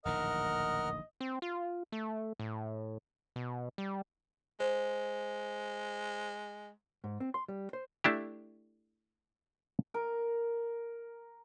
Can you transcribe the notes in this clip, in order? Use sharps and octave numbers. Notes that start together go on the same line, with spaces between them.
D1 A#1 D#3 A#4 D#5 F#5 F6
C4
F4
A3
A2
B2
G3
G#3 C5
G#2
C4
C6
G3
C5
A3 D4 E4 G4
A#4